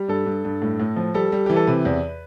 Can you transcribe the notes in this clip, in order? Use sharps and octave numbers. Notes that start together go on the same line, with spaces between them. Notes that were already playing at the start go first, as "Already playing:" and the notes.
Already playing: G3
G2 A4
G2
G2
A2
A2
F3
G3 A4
G3
E3 G4
A4
C3 B4
E2